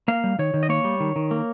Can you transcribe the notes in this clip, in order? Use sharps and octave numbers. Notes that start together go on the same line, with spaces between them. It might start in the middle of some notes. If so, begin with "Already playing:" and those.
A#3 F5
G3
D#3 C#5
D#3
D#5
A#3 C#5
G3
D#3
D#3
A#3